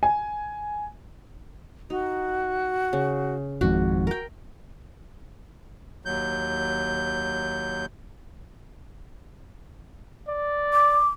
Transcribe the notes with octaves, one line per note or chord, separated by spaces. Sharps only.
G#5
D#4 F#4
C#3
G#1 F2 G#2 F#4 D6
A#4 G5
D#2 F#3 G6
D5
D6